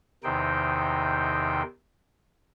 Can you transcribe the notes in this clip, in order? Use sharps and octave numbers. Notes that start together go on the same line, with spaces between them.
E2 C3 D#3 D#4 C5 G5